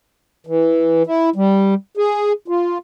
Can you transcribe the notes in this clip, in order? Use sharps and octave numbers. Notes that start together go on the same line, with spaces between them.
E3
E4
G3
G#4
F4